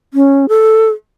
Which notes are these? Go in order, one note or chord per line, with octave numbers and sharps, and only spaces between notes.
C#4
A4